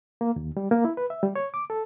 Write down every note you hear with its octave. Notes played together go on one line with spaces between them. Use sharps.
A#3
D#2
G3
A#3
E4
B4
E5
G3
C#5
D6
A4